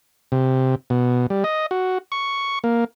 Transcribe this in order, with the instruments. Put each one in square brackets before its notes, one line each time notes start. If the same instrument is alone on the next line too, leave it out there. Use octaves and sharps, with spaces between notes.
[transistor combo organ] C3
B2
G3
D#5
F#4
C#6
A#3